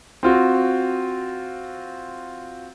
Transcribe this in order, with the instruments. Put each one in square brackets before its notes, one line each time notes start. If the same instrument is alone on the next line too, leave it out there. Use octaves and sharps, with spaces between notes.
[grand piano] C4 F4 F#4